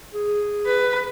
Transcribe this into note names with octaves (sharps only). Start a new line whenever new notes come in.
G#4
B4